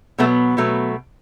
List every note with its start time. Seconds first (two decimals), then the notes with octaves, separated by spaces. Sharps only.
0.18 B2 F#3 A3 B3
0.57 B2 F#3 A3